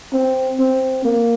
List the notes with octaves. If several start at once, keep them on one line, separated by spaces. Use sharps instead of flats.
C4
C4
A#3